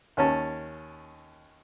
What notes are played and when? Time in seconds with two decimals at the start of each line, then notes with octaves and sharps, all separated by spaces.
0.17 D#2 C#4 A5